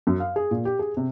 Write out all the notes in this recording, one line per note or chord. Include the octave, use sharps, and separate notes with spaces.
F#2
F5
G#4
A#2
G4
G#4
C3